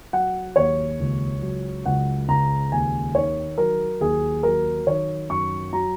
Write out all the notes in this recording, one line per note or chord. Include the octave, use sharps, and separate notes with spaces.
F#3 F#5
D#2 C#5
C#2
F#3
C#2 F#5
C#2 A#5
D#2 G#5
D#3 C#5
F#3 A#4
D#2 G#4
F#3 A#4
D#3 C#5
F#2 C#6
F#3 A#5